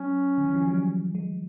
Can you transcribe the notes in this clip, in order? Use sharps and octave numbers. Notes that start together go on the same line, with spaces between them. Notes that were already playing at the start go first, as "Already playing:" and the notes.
Already playing: F#3 C#4
D#3
E3
F3
F#3
G3
G#3